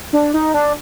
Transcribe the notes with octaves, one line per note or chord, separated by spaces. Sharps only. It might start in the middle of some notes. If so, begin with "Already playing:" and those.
D4
D#4
D4